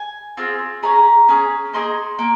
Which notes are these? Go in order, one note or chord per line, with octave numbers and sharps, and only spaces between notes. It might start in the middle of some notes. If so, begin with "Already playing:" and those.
Already playing: G#5
C4 F4 G#4
C#4 G#4 A#5
C#4 G#4
A#3 D#4 G#4 C6
A#3